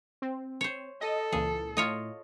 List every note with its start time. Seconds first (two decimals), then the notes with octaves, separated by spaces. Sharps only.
0.22 C4
0.61 C5 C#5
1.01 A4 D#5
1.32 C#2 A#2 E3 G#4
1.77 A2 F4 C#5 D#5